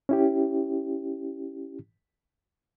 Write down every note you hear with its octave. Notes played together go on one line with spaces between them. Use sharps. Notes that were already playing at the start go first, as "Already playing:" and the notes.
C#4 E4 G4